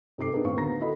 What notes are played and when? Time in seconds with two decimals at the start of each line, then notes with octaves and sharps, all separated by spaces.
0.18 G#2 C3 A4 D6 C7
0.32 B3 D4 D#4 G#4 A#4 B4
0.44 A2 D#3 C4 F5 C#6
0.57 D2 B3 D4 A#4 A#5 A#6
0.79 D#4 E4 F#4 A4 D#5 B5